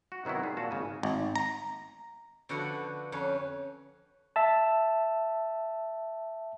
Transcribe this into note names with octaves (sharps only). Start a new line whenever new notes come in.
F#4
C3 D#3 F#3 B3 E4
G3 G#4
A#2 F#4 A5
G#1 C#3 G#5
G#1
A#5
D3 F3 F#4 B4 E5 F#5
F2 C#4 B4
E5 A5